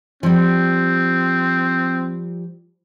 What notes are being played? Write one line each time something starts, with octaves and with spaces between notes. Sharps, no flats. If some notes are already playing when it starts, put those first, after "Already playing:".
F3 G3 C4